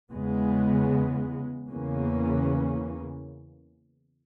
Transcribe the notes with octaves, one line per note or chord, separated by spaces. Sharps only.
E2 C#3 G#3 B3
E2 C#3 E3 A#3 C#4